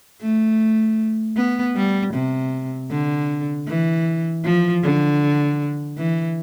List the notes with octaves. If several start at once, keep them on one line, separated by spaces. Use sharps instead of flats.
A3
B3
G3
C3
D3
E3
F3
D3
E3